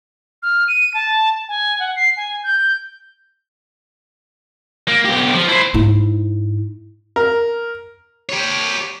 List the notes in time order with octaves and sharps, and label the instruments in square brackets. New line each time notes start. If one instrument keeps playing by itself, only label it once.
[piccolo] F6
D#7
A5
G#5
F#5
C7
G#5
G6
[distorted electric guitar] A#3
B1 G4
F3
E4 C5
[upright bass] G#2 E4
[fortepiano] A#4
[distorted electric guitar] G4 C#5